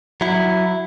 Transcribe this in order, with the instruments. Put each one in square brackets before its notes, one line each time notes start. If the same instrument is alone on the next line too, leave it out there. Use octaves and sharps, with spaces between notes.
[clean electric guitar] F#3 E4